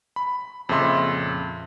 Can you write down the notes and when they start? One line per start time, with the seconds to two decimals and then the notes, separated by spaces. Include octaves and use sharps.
0.16 B5
0.69 F2 A#2 C#3 E5 C6